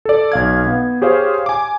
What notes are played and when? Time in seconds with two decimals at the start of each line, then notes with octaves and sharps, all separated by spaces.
0.05 A4 D5
0.32 B1 F5 G#6
0.67 B3
1.02 G4 G#4 C5 C#5 F5
1.46 G#5 D6